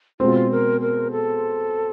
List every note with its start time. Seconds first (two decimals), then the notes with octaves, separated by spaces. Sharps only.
0.20 B2 G#3 C4 F4
0.51 A#4
0.81 A#4
1.12 A4